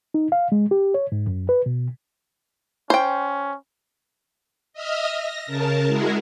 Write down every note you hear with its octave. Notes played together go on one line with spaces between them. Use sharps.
D#4
F5
G#3
G4
C#5
G#2
F#2
B4
B2
C#4 C5 G5
D#5 E5 D#6 F6
A#6
C#3 A#4 A5
G#3 E4 F#4 G#4 A#4